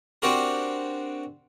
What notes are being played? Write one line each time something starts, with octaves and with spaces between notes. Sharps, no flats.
C4 D4 F#4 G4 A#4